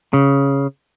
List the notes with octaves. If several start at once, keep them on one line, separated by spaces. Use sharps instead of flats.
C#3